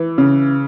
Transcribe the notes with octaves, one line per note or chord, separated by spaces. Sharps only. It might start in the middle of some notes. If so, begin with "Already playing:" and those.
Already playing: E3
C#3